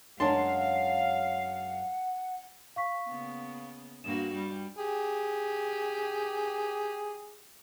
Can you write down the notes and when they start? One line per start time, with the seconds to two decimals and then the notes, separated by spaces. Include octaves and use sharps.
0.20 F#2 F#3 G#3 D4 F5 F#5 A5 C6
2.76 F5 C#6 B6
3.07 C#3 A#3 B3
4.04 G2 A#3 F#4 E7
4.35 G3
4.78 G4 G#4